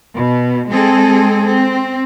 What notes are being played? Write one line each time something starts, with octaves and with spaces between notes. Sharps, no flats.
B2
G#3 C4 G#4 A4
C4